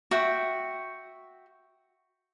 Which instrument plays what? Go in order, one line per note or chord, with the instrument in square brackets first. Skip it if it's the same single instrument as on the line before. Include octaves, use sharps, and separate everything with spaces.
[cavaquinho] F#4 E5 G5